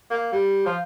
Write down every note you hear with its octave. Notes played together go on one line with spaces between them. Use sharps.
A#3
G3
F3